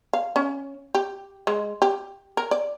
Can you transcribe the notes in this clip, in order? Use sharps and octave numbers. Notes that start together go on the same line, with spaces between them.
F5
C#4
G4
G#3
G4
A#4
D5